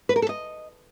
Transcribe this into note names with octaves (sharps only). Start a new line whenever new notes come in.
B4
A#4
A4
D#5